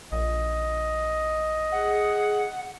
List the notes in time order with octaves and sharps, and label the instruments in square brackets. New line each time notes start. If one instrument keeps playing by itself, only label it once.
[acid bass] A#1 [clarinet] D#5
[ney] G#4 [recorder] F#5